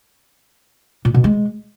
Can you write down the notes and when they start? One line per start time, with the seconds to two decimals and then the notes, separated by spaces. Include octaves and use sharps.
1.05 A#2
1.14 B2
1.24 G#3